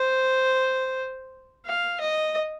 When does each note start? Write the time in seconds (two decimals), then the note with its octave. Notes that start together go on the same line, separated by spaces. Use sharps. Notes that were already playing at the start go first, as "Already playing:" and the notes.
Already playing: C5
1.65 F5
2.00 D#5